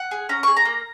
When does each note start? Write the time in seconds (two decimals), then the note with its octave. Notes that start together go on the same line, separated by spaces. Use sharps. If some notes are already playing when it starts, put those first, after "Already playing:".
Already playing: F#5
0.11 G#4
0.29 C#4 A#5
0.43 G#4 C#6
0.56 A#5
0.65 A#3